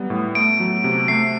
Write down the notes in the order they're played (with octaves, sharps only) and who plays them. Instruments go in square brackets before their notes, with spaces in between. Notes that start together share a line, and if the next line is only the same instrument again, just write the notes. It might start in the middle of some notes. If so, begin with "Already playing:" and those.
Already playing: [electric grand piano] F#3 G3 B3
A2
[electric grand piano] A3 [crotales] D7
[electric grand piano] F#3
C3
[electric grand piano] A3 [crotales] C7